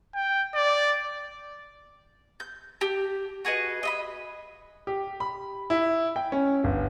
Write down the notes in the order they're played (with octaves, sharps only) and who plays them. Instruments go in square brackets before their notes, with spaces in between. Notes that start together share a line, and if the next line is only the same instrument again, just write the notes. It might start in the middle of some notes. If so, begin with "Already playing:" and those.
[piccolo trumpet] G5
D5
[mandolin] G6
G4
F#4 G#4 B4 D#5
D#5 E5 B5
[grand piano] G4
B5
E4
G5
C#4
G1